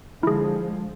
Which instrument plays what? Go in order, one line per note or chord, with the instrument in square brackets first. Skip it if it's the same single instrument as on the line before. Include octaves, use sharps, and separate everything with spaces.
[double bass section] D3 F3 G#3 [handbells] E4 G#4